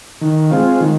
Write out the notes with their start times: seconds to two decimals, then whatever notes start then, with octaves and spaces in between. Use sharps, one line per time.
0.21 D#3
0.51 G#3 C4 F4
0.80 D#3